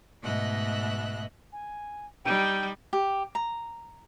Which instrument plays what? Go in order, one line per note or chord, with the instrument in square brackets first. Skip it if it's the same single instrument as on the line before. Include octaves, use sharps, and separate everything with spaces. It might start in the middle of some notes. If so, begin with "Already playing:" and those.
[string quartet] G#2 B2 A3 D#5 E5 F#6
[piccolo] G#5
[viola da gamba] G3 D#4 [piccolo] G5
[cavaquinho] G4
A#5